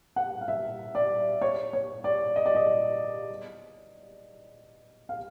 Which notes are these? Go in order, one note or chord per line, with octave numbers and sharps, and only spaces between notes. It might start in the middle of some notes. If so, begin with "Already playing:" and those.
F#5
F5
E5
D5
C#5
C#5
D5
D#5
D5
D#5
F5